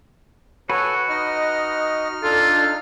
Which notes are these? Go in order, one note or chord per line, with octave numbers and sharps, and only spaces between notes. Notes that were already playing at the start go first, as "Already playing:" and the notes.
F#4 A4 B4 C#5 G#5
D#4 D#5 F6
D4 F4 A4